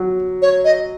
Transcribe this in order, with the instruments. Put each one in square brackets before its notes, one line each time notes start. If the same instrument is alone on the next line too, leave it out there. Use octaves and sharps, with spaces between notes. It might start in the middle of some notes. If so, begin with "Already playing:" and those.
Already playing: [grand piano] F#3
[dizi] C#5
D#5